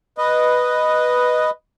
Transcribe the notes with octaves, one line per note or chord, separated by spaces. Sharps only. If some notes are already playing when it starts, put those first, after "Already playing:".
B4 D#5